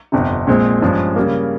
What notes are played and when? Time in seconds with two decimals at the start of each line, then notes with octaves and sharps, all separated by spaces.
0.12 G1 F2 C3
0.47 A#1 A#2 G#3 C4
0.82 G2 F3 G#3 C#4 G#4
1.16 C#3 G3 A#3